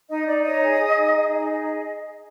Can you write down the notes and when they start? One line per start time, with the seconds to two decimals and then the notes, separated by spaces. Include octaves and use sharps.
0.09 D#4 D#5
0.26 D#4 D5
0.44 C#5 D#5
0.63 G#4
0.80 G#4
0.97 D#4
1.16 G#4
1.33 D#4 D#5
1.51 G#4